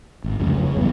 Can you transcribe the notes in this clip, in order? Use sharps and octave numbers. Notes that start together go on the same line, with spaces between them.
G#1
F1 C#2 F#2 C#3
C#3
F#1 G2 E3 B3